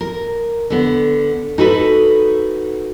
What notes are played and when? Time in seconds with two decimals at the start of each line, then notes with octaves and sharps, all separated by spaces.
0.01 A#4
0.70 D3 B3
1.58 D#4 F#4 A4 B4